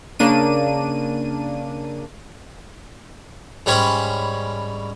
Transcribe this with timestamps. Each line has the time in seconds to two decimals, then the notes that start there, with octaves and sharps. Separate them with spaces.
0.19 C#3 A#3 D4 D#7
3.66 G#2 G3 C#4 B5